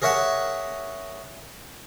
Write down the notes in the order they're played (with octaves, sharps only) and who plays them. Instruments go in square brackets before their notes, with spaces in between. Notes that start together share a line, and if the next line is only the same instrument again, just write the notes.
[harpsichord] G#4 A#4 C#5 E5 F#5 A5